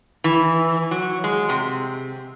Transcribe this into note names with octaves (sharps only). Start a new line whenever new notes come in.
E3
F#3
G#3
C3